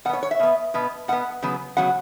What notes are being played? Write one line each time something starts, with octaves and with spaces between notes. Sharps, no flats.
B2 B3 C#5 F#5
C#5
E5
B2 B3
B2 B3
B2 B3 F#5
C#3 F#3 B3
C#3 F#3 B3 F#5